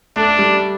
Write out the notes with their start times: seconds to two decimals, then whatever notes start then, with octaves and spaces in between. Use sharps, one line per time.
0.16 A3 D4
0.39 G3